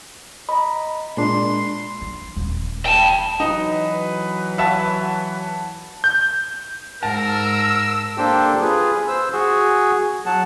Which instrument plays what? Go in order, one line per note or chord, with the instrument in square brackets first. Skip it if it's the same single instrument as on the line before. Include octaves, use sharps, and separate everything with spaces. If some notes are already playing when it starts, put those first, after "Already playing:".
[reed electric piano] D#5 A#5 [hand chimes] B5
[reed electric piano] A#2 G#3 D4 [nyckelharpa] C6
[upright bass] E4
D#1
[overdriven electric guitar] G5 A5
[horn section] E3 F#3 B4 [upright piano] D#4
[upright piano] C#5 E5 B5 [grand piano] F#5 A5
[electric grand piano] G6
[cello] G#2 [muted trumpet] A#4 [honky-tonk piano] A5 [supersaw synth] E6
[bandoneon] A#3 D4 G4 A4 C5 G5
F4 G#4 B4
C5 E6
F#4 G#4
F#3 F#5 A5